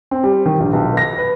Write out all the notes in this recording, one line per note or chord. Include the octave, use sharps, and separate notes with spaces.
C4
G3
D#3
A#1
B1
A#6
B4